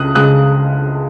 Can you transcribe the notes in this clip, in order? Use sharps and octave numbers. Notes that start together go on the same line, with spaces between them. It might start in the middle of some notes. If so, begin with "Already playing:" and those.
Already playing: C#2 C#3 D#6 F#6
C#2 C#3 G#3 D#6 F#6